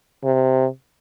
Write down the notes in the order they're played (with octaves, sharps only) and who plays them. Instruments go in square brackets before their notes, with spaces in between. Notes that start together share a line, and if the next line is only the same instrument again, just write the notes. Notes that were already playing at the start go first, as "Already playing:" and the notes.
[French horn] C3